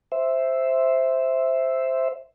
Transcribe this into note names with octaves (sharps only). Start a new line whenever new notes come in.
C5 E5